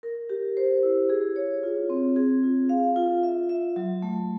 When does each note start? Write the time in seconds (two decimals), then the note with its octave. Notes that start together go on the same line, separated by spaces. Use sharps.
0.03 A#4
0.29 G4
0.57 C5
0.83 E4
1.10 G#4
1.36 C#5
1.63 F4
1.90 C4
2.16 G#4
2.43 F4
2.69 F5
2.96 F4
3.23 E5
3.49 E5
3.76 F#3
4.02 A3